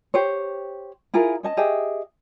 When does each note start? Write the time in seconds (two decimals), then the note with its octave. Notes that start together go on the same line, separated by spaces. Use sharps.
0.14 G4 C5 C#5
1.14 E4 F4 G#4 A#4
1.43 C#4 D#5 A5
1.57 G4 G#4 D#5 E5